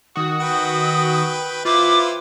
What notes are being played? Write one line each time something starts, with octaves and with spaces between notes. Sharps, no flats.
D#3 F#4 D#6
B4 G5
E4 F4 B4 C5 D6